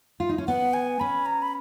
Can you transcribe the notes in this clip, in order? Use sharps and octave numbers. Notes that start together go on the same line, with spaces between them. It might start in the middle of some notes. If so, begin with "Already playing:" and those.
F4
D#4
C#4
B3 F#5
G#5
C#4 B5
A#5
B5